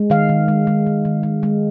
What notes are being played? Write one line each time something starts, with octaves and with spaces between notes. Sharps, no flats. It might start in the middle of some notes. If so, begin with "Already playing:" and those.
Already playing: G#3
D#3 F5
D#3
G#3
G#3
D#3
D#3
G#3
G#3